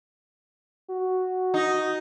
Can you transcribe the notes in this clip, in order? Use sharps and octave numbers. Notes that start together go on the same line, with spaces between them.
F#4
D#4